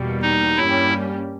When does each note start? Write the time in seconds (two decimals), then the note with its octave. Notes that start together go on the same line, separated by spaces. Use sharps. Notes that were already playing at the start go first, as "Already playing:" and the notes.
Already playing: E2 B2 G3 A#3
0.22 D#4
0.57 G2 G3 A#3 C#4 E4 G4